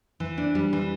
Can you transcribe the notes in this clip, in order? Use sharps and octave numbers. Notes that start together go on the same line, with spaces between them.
E3
D4
G3
E3